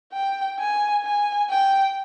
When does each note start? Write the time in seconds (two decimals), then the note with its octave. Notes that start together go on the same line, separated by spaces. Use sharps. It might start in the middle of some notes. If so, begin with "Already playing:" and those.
0.13 G5
0.59 G#5
1.04 G#5
1.50 G5